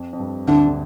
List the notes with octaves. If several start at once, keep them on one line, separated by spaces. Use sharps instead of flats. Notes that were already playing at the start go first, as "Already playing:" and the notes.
Already playing: F2
F2
G2
D2 D3 D4
D3